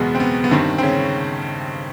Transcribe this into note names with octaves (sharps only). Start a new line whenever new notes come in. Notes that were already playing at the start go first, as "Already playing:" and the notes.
Already playing: F#1 E2 B2 G#3 B3
C4
B3
B3
G1 G2 D#3 C4
C4
C#3 C#4